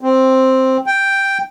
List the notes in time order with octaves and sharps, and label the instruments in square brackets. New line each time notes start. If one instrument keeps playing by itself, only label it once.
[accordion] C4
G5